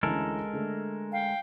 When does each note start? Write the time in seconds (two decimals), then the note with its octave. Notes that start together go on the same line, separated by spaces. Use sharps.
0.03 D2 E3 G#3 C#4 A4 A#4
0.53 D3 A3
1.11 F5 G5